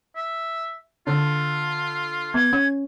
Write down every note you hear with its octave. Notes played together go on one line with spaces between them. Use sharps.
E5
D3 F4
B3 G#6
C#4